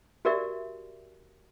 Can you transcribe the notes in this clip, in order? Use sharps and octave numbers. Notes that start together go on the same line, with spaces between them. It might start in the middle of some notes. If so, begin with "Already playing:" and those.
F#4 G4 A#4 D5 E5